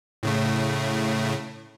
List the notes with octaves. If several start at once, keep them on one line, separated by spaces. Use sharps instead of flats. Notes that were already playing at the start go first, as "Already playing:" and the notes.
A2 C#3 A3